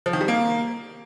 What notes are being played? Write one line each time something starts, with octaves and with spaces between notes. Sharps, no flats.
F3
D#3
G3
A#3